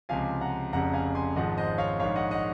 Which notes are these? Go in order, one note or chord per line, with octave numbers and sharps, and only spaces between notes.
C#2 C3 F3 F5 G#5
F#5 A#5
F1 F2 C#3 F#5 A#5
F5 G#5
G#5 C6
G#1 G#2 F3 G#3 D#5 F#5
C5 D#5
C#5 F5
A#1 G#2 D#3 C#5 F5
D#5 F#5
D#5 F#5